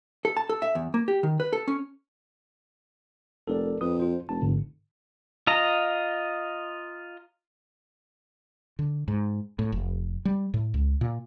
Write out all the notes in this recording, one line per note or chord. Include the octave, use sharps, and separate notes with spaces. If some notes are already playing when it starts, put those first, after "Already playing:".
A4
A5
A4
E5
E2
A#3
G4
D#3
B4
A4
C#4
F1 A4 A#4 D5
F2 B4 D#6
F4 C5
F1 A5
A1 G#2 D3
F4 D#5 A#5
D3
G#2
A2
F1
G3
A2
C#2
A#2